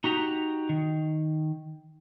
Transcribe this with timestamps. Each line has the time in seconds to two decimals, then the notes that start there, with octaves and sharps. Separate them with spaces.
0.04 D#4 F#4 G4 A#5
0.69 D#3